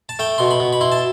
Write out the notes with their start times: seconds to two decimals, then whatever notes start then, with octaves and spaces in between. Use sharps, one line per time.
0.09 A5
0.19 A3 G5
0.38 B2 C6
0.51 B5
0.60 B2
0.73 B5
0.81 E4 C6
0.92 A5